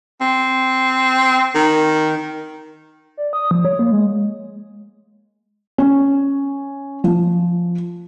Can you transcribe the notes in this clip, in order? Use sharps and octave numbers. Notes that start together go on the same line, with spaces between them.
C4
D#3
D5
D#6
F3
C#5
A#3
G#3
C#4
F3